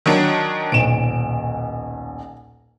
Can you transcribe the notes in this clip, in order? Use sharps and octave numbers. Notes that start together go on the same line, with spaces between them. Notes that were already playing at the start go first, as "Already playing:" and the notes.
D#3 F#3 D4
D#1 B1 D7 E7